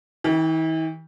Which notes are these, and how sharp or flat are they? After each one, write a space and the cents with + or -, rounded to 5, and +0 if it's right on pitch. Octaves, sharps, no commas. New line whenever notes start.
E3 -45 G4 +0